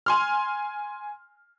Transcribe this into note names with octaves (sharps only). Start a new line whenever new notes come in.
G#5 C6 F6